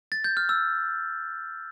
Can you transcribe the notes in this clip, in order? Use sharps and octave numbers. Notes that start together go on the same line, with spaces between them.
A6
G6
F6
E6